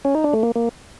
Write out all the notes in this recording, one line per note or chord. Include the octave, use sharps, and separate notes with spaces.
C#4
D#4
D4
A3
A#3
A#3